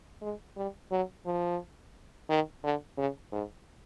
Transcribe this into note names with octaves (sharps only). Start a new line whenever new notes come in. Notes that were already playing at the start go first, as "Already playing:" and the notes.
G#3
G3
F#3
F3
D#3
D3
C#3
G#2